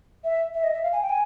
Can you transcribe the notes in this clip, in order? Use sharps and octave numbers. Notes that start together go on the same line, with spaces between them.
E5
E5
D#5
E5
F5
G#5
G5
G#5